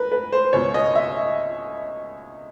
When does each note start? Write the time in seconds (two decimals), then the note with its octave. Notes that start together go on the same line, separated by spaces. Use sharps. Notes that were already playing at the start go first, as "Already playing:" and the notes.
Already playing: A#4 B4
0.12 B4
0.32 C5
0.53 C#2 B2 C#5
0.74 D#5
0.95 E5